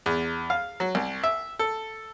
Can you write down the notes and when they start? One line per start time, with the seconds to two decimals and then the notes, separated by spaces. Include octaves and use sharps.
0.06 E2
0.50 F5
0.80 F#3
0.95 C2
1.24 E5
1.59 A4